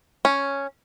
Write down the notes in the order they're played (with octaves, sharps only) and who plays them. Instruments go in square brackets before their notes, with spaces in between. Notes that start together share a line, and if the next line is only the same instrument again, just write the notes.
[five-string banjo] C#4